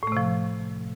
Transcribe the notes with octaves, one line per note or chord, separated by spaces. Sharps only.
A2 C3 F3 A3